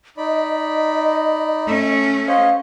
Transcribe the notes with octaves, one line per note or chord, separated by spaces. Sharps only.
D#4 D5 D#5 B5
A3 C#4
C5 C#5 D#5 F5